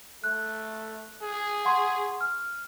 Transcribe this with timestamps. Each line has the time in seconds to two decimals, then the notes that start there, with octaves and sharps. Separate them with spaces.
0.24 A3 F#6
1.22 G#4
1.65 F#5 C6 C#6
2.21 F6